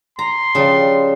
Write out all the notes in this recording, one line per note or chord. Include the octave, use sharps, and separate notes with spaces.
A#5 C6
C#3 F3 G3